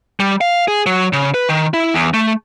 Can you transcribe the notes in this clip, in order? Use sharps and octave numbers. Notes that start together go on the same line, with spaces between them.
G3
F5
G#4
F#3
C#3
B4
D#3
E4
E2
A3